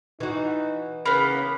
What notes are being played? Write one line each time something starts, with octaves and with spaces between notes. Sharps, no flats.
E3 D#4 F#4
C#3 A#3 B3 B5